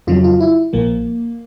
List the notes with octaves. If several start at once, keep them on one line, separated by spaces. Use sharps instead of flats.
F2 C#3 F#3 F4
F4
E4
A#1 A#2 F3 A#3